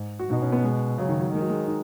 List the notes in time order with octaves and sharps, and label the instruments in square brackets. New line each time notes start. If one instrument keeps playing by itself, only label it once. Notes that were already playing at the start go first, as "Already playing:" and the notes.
Already playing: [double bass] G#2
[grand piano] F#4
[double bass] B2 [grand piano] D#4
[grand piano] C#4
B3
G#3
[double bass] C#3 [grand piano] F#3
[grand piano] D#3
F#3
[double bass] D#3 [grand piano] G#3
[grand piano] F#3
G#3
D#4